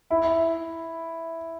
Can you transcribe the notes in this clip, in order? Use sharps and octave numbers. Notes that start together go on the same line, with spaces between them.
E4